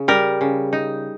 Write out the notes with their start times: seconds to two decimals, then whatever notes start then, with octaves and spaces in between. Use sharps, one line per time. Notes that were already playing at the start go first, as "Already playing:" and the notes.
Already playing: C#3
0.08 G3 A#4
0.41 C#3
0.73 D#4